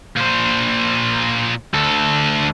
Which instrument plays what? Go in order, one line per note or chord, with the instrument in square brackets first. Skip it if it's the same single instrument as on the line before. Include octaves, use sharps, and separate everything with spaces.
[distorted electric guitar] A#2 C5
D2 A4